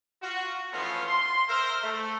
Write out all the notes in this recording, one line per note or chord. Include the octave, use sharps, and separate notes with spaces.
F4 F#4
E3 F3 A3 B3 C#4 F4
C6
A#4 C5 E5
A3